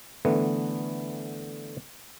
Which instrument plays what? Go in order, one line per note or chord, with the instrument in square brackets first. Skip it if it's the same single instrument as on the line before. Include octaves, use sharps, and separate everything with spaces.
[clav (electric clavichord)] D3 E3 A3 B3